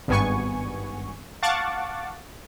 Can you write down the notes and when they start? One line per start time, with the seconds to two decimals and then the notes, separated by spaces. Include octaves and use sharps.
0.08 G#1 G2 B3 G#5 C#6
1.42 F5 F#5 A5 C#6 D6 A6